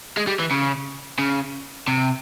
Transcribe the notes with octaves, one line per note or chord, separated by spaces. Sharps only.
G#3
G3
E3
C#3
C#3
C3